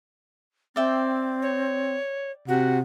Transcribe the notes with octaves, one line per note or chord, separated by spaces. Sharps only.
C4 D5 E5 G5
C#5
C3 F#4 F#5